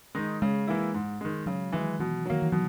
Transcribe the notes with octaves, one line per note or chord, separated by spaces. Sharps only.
D#3 G#3 D#4
C#3 G#3
E3 A#3 E4
G#2
D#3 G#3
C#3 F#3
D#3 E3 G#3
B2 E3
D#3 F#3 A#3
E3
B2 F#3